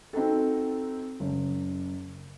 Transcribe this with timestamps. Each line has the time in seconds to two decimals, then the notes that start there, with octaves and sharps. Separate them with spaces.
0.13 C4 D#4 F#4 A4
1.20 F#1